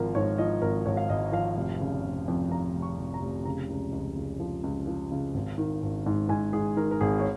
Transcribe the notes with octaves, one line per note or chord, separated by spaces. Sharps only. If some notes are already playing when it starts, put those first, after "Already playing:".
Already playing: G#1 F3 A#4
G#2 C#5
F3 D#5
G#1 A#4
G#1 C#5
F5
G#1 D#5
F3 F5
F1
C#3
F1
F2
F2 A#5
F1
C#6
F1
A#5
F1
C#3 A#5
C#2
C#2
C#2
F3
C#2
F3
C#3
G#1
D#3
G#1
G#2
G#2 G#5
G#2 G#4
D#3 A#4
A#4
G#1 G#4
C#5